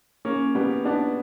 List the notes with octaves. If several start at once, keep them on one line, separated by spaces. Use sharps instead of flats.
A#3 C#4
G3 B3
B3 D4